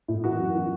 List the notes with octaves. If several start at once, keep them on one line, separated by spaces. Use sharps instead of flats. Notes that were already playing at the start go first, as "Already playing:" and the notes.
A2
E3 F#4
F#2
E3